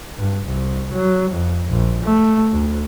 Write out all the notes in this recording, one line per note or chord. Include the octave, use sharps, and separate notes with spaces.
G2
C2
F#3
F2
A#1
A3
D2